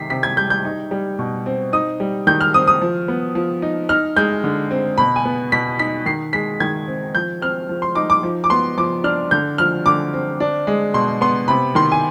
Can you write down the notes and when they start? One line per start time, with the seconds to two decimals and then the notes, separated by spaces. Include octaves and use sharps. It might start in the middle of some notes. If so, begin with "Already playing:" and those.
Already playing: C3 D#3 B6 C7
0.10 C3 B6
0.23 G#6
0.37 G3 G6
0.50 G6
0.65 D#4
0.91 G3
1.19 B2
1.46 C4
1.73 D#4 D#6
2.00 G3
2.27 D#3 G6
2.41 F6
2.54 C4 D#6
2.68 D#6
2.81 F3
3.08 B3
3.35 F3
3.62 D#4
3.89 D#4 F6
4.16 G#3 G6
4.44 D3
4.71 C4
4.98 B2 B5
5.16 G#5
5.25 B3
5.52 B2 B6
5.79 D#4 B6
6.06 D#3 C7
6.33 G#3 B6
6.60 D#3 G#6
6.87 C4
7.14 F3 G6
7.42 C4 F6
7.69 F3
7.82 C6
7.95 D#4 D6
8.10 D6
8.23 F3
8.44 D6
8.50 B3 C6
8.78 F3 D6
9.04 D4 F6
9.31 D3 G6
9.58 F3 F6
9.86 D3 D6
10.13 C4
10.40 D4
10.67 G#3
10.94 B2 C6
11.21 B3 C6
11.48 C3 B5
11.75 D#3 C6
11.92 G#5